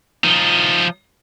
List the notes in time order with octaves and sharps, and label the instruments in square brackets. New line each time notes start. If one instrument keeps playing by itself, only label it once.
[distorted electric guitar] F3 D#4